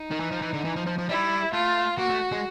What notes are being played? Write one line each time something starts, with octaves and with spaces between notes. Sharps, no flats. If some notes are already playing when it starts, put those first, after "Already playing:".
Already playing: D#4
D#3
E3
F3
E3
D3
E3
F3
F3
F3
G3 E4
A3 F4
A#3 F#4
A3
G#3